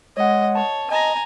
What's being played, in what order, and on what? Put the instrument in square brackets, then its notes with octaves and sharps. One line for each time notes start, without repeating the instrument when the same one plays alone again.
[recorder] G#3 [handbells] C#5 F#5 [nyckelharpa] D#5
[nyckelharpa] C#5 [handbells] A5
[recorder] D#5 [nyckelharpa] G#5 A#5